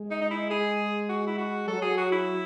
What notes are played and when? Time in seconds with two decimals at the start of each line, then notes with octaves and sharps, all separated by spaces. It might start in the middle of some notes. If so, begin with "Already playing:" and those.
Already playing: G#3
0.11 D#4
0.21 D#4
0.31 E4
0.50 G#4
1.09 F#4
1.27 E4
1.38 F#4
1.68 F#3 A4
1.82 G#4
1.97 F#4
2.12 E4